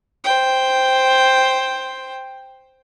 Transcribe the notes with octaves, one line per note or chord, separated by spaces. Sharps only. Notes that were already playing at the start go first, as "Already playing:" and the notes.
C5 G5